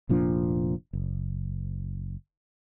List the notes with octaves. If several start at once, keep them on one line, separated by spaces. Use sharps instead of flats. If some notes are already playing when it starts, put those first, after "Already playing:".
F1 A#2 F3 D4
F#1